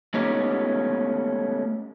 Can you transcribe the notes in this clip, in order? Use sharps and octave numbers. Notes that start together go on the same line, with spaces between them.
G#3 A3 B3 C#4 D#4 G4